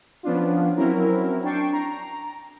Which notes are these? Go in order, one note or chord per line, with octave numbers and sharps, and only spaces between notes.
F3 B3 C#4 D4 F4
F#3 C4 C#4 E4 A#4
D4 G5 A5 C#6 C7 D7
A#5